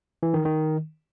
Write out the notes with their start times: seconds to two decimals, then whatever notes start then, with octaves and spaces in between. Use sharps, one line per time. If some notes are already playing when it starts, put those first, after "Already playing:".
0.23 E3
0.34 D#3
0.45 D#3